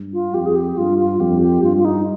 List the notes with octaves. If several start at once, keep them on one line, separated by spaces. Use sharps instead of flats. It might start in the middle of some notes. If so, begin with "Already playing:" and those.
Already playing: G2
F4
F2 G4
G#4
G4
G2 F4
F4
F2 G4
G4
G2 F4
F4
D#4